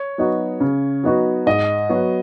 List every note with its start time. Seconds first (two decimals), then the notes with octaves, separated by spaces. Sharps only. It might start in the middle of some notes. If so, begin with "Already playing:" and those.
Already playing: C#5
0.18 F#3 B3 D#4 F#4
0.60 C#3
1.04 F#3 B3 D#4 F#4
1.46 G#2 D#5
1.89 F#3 B3 F#4